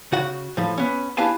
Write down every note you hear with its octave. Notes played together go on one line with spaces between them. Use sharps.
C#3 F#4 F#5
A2 F3
B3 C#4
D4 E4 G4 F5 G#5 A5